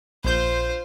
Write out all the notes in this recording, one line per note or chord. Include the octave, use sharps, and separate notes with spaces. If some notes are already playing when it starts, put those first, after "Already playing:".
A#1 F4 C5 G6